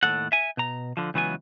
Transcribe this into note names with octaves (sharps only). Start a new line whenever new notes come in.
D#2 A2 F3 A4 F#5
E5 G#5
B2 A#5
D3 F3
C#2 E3 F#3 B3 G#5